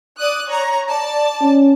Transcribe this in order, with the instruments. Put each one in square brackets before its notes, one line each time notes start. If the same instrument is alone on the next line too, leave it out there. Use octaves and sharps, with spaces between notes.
[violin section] D5 D#6 F#6
C#5 A#5
D5 A5
[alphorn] C#4